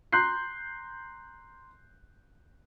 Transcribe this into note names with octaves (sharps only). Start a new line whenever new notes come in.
A#5 C6 F#6 G6 C7